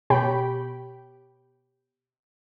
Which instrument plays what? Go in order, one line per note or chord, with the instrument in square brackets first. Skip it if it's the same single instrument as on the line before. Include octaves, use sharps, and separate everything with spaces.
[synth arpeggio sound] B2 G4 C#5 G5 B5